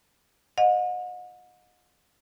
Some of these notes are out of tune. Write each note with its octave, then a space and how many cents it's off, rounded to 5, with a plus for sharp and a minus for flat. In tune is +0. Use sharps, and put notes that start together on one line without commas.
D#5 -10 F#5 -40